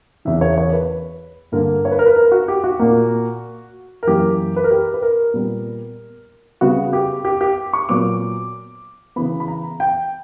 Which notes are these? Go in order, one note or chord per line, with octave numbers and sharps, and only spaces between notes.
E2 C#3 E3 E5
C#5
C#5
B4
G2 D3 A#3 A#4
C#5
B4
A#4
B4
A#4
F#4
G4
F#4
A#2 A#3
A#4
F#2 E3 A#3 G4
B4
A#4
G4
B4
A#4
A#2 G3 B3
C#3 G3 B3 F#4
G4
G4
G4
C#6
A#2 F#3 B3 D6
C#3 E3 B3 B5
B5
A#5
G5